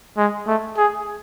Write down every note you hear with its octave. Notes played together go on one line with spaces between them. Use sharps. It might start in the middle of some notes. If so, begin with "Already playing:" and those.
G#3
A3
G#4